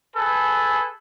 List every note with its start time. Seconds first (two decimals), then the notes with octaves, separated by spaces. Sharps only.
0.15 G#4 A4 B4